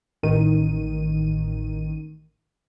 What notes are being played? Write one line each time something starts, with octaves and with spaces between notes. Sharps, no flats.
A1 D#3 D#7